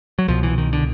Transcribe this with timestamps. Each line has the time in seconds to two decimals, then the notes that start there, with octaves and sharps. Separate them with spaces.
0.19 F#3
0.28 C2 B2 F3
0.43 E3
0.58 D#3
0.73 D3